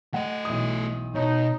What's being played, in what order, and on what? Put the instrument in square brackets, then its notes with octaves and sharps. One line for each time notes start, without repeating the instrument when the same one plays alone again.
[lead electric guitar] A3 D#5 [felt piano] F#5
[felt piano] B1 E3 D#6
[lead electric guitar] B2 [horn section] D#4 [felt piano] C#5